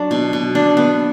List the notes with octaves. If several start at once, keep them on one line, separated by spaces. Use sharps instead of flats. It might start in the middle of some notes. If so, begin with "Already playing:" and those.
Already playing: F#3 D4
B2
B2
D4
B3